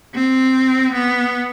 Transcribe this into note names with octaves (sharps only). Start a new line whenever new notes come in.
C4
B3